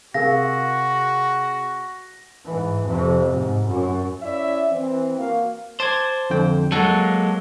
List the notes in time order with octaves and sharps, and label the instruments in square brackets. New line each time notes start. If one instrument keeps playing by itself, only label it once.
[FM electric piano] C3 G#4 [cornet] F#4 [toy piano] A#4 F5 [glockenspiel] A#6
[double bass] G#2 E3
F2 C3
G#2
F#2
[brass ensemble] C#4 E4 D5 E5
E3 C4
A#3 F#4 F5
[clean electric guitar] C5 [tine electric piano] A5 D6 G#6
[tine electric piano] F2 D3 G5
[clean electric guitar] F#3 G#3 A#3 [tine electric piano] A4 F#5